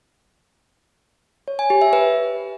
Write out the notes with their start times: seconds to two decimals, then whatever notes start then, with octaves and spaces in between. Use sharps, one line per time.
1.48 C#5
1.59 G#5
1.70 G4
1.82 E5
1.93 B4